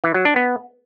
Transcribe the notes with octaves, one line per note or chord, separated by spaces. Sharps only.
E3
F#3
D4
B3